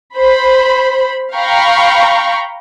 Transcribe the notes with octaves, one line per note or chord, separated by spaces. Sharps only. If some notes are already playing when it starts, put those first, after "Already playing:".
C5 B5
F5 G5 A#5 B5 C#6